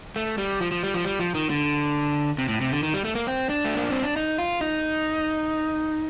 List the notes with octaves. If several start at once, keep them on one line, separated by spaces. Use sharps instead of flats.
A3
G3
F3
F3
G3
F3
G3
F3
D#3
D3
C3
A2
C3
D3
D#3
G3
A3
A#3
C4
D4
A3
A#3
C4
D4
D#4
F4
D#4